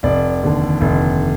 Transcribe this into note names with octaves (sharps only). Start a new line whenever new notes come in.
F1 D5
D#2 D3
F1